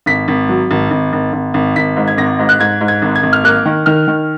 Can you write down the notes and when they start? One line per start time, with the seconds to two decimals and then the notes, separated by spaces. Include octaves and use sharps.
0.06 G#1 B6
0.28 G#1
0.49 F#3
0.71 G#1
0.91 G#1
1.13 G#1
1.33 G#1
1.54 G#1
1.76 G#1 B6
1.97 G#2
2.08 G#6
2.18 G#1 A#6
2.39 G#2
2.49 F#6
2.60 G#2 G#6
2.81 G#2
2.88 G#6
3.02 G#1
3.16 G#6
3.23 G#1
3.33 F6
3.44 A#3 F#6
3.66 D#3
3.86 D#3 F6
4.08 D#3